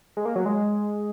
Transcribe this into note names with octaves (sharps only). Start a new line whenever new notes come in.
G#3
A#3
F#3
G#3